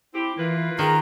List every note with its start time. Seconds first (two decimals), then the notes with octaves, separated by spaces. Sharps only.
0.14 C4 E4 G4
0.38 E3 A#3 F4 B4
0.79 D#3 G#4 A#5